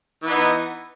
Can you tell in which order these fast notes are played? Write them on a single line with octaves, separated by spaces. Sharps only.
E3 B3 D#4